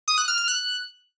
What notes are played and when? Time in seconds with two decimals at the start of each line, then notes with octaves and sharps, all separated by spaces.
0.08 D#6
0.18 F#6
0.28 F6
0.38 F6
0.48 F#6